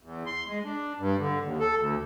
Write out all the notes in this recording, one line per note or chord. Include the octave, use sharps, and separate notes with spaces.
E2
C6
G#3
D4
G2
D3
D#2
A4
D2